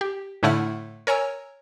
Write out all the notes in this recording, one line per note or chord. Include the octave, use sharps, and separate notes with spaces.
G4
A2 D3 A3 E4 F#5 F6
A#4 C#5 G#5 A#5 E6